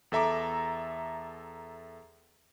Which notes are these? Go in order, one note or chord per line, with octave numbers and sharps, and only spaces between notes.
E2 A4 E5 A#5 D6